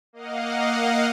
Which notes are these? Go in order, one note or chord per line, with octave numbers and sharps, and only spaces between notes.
A#3 D#5 F5 F#5